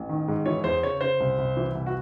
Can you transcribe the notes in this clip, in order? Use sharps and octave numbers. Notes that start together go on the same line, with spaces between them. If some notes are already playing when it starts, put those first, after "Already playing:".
Already playing: A1
D#3
G#2
E3 C#5
E2 C5
C#3 C#5
C#3 C5
C2
C2
E3
C2
F#4